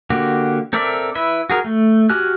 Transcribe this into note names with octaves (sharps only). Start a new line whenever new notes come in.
D3 A#3 F#4 G4
C4 A4 A#4 D5 E5
E4 B4 E5
F#4 G#4 A#4
A3
F#4 G4 G#5 F6 F#6